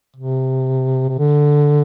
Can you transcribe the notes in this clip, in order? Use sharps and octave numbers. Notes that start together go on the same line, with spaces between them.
C3
C3
D3